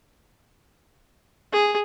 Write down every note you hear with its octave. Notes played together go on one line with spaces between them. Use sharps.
G#4